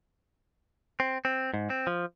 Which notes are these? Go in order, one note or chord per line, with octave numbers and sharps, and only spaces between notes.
C4
C4
G#2
C4
F3